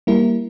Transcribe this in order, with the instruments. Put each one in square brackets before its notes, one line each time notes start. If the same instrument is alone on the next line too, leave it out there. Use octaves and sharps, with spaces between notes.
[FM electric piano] G3 A#3 E4 A#4